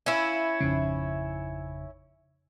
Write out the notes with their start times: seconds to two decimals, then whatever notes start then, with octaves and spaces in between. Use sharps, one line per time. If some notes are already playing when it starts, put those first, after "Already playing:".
0.06 C#4 E4 F5
0.61 G#1 F2 C#3